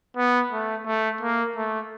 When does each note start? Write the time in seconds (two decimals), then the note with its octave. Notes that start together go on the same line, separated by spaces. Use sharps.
0.17 B3
0.52 A3
0.86 A3
1.21 A#3
1.56 A3